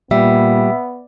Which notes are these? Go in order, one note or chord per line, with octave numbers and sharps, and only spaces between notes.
A#2 G3 B3 E5